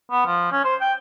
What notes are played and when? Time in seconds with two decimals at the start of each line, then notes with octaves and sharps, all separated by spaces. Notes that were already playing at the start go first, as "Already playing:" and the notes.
0.11 B3
0.26 F3
0.52 C#4
0.65 C5
0.81 G5